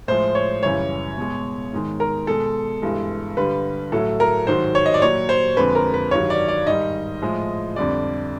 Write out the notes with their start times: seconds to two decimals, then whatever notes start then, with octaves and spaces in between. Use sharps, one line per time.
0.08 A2 F3 G#3 C5
0.35 C#5
0.63 F#2 C#3 E3 G3 C#5
1.18 B2 G#3
1.72 G#2 D#3 G#3
2.00 A#4
2.27 B2 G#3 A4
2.82 G2 E3 G#3
3.37 G2 D3 G3 B4
3.92 A2 F#3 A4
4.20 A#4
4.47 G#2 D#3 F#3 C5
4.75 C#5
4.86 D#5
4.94 D5
5.02 A#2 F#3 C#5
5.29 C5
5.57 F2 D3 F3 G#3 B4
5.75 A#4
5.94 B4
6.11 G2 D#3 F#3 C#5
6.30 D5
6.48 D5
6.67 G#2 D#3 G3 D#5
7.22 A2 F3 G#3
7.76 F2 D3 G3 D5